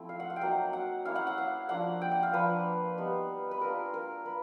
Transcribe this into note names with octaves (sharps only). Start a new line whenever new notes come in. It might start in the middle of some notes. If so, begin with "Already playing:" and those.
Already playing: F3 A3 C4 E4
F5
F#5
F5
G5
F#3 A#3 D#4 F#5
F#5
A#3 C#4 E4 F5
F#5
F#5
F5
F3 A#3 D4 F#5
G5
F#5
F5
F3 A#3 D4 B4
G3 B3 D#4
B4
A#3 D4 F4 A#4
A#4
A#3 B4